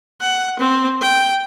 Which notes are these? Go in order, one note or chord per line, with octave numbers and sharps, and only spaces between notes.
F#5
C4
G5